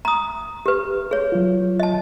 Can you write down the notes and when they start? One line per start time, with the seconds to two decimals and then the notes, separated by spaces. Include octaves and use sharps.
0.05 A#5 D#6
0.66 G4 B4
1.11 G#4 C#5
1.32 F#3 F4
1.80 D#5 A5